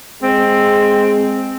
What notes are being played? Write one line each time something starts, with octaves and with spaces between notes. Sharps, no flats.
G#3 C4